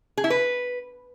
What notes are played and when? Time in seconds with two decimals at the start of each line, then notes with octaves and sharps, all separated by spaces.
0.18 G#4
0.24 E4
0.30 B4